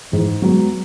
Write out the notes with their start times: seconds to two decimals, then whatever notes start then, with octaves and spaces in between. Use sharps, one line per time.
0.12 G#2 E3
0.42 F#3 G#3 B3